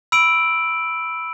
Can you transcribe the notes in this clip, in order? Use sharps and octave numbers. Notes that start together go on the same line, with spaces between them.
B5 E6 D7 F#7